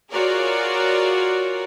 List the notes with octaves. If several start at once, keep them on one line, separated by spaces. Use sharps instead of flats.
F4 F#4 G#4 A#4 C#5 D5